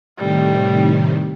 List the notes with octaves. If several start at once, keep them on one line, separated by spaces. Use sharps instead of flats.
A2 C3 D#3 G3